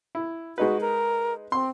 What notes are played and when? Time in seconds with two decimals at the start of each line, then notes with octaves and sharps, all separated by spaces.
0.15 E4
0.58 G#3 D#4 F#4 B4
0.81 A#4
1.52 C4 C6